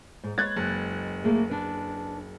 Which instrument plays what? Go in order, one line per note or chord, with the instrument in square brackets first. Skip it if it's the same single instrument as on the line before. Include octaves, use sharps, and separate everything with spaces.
[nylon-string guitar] G#2
[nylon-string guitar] G#3 B4 C#5 [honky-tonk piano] F#6 G#6 A6
[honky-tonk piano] F#1
[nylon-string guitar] A3 A#3 G#4
D4 B4